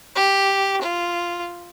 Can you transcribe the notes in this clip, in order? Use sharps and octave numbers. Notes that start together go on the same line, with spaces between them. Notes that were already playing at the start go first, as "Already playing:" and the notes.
G4
F4